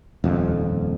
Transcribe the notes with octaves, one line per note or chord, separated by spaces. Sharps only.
D#1 F2